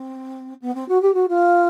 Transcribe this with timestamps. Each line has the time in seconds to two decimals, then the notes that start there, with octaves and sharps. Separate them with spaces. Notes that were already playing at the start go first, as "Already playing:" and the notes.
Already playing: C4
0.61 B3
0.75 C4
0.88 F#4
1.02 G4
1.14 F#4
1.28 F4